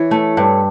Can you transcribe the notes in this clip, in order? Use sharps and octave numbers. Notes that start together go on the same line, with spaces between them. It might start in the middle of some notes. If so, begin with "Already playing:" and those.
Already playing: E3 C#5
A3
G2